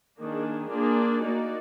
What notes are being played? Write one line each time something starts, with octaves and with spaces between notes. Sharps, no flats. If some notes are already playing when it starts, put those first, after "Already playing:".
D#3 A#3 D4 G#4
A#3 D4 F4 G#4 D5
A#3 D#4 F#4 D5